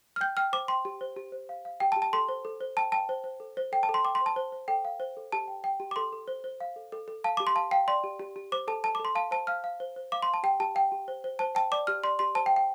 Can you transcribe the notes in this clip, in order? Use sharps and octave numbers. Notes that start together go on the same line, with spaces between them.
F6
G5 G6
G5 F6
C5 D6
G5 C6
G4
C5
G4
C5
F5
F5
G4 G5
A5
G4
A5
A4 C6
C5
A4
C5
G5 A5
G5 A5
C5
C5
A4
C5
A4 G5
A5
A4
C6
G5 D6
C6
C5
A5
C5
C5
A4 G5
F5
C5
A4
G4 A5
G5
G5
G4
D6
A4 C6
A4
C5
C5
F5
A4
A4
A4
F5 A5
G4 D6
C6
F5 A5
F5 G5
D5 C6
G4
G4
G4
C5 D6
A4 A5
A4 A5
D6
A4
C6
F5 A5
C5 A5
F5 F6
F5
C5
C5
F5 D6
C6
F5
A5
G4 G5
G4 A5
F5 G5
G4
C5
C5
C5 A5
G5 A5
D5 D6
G4 F6
D5 C6
G4 C6
C5 A5
G5
F5
G5